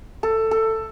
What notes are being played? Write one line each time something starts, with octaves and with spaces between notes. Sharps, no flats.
A4
A4